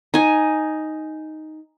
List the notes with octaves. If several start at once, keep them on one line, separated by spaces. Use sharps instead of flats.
D#4 G#5